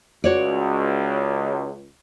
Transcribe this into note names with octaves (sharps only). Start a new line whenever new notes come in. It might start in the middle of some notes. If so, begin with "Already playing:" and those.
C#2 F#4 C#5 D5